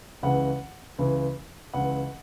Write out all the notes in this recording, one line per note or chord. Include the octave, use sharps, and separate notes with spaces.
C#2 C#3 E3 F#5
C#2 C#3 E3
C#2 C#3 E3 F#5